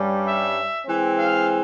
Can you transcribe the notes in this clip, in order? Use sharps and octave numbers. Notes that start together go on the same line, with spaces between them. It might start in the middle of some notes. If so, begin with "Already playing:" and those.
Already playing: G2 G3 C#4
E5
E3 G#3 C4
F5